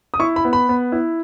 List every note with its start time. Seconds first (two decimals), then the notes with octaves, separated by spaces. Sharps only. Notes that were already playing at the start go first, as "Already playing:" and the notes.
0.14 D#6
0.20 E4 C#6
0.36 B5
0.45 B3
0.53 B5
0.69 B3
0.92 E4